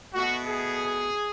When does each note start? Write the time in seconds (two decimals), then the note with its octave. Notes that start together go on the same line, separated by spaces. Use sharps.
0.14 B2 A3 F#4
0.47 G#4